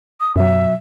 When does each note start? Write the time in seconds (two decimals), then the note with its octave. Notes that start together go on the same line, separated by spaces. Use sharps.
0.21 D#6
0.36 F#2 B2 F#3 E5